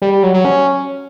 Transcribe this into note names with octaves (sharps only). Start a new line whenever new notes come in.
G3
G3
F#3
F#3
C#4